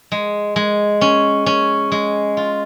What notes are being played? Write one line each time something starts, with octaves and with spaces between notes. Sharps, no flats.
G#3
G#3
C#4
C#4
G#3
F4